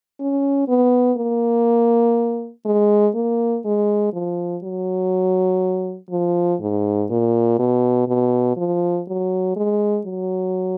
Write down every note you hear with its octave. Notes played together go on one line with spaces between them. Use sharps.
C#4
B3
A#3
G#3
A#3
G#3
F3
F#3
F3
G#2
A#2
B2
B2
F3
F#3
G#3
F#3